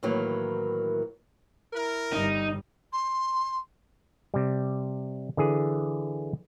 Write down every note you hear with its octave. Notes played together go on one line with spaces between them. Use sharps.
A2 D#3 E3 F#3 A#3
E4 A#4
G1 G3 D#4
C6
C3 G3
D3 E3 G#4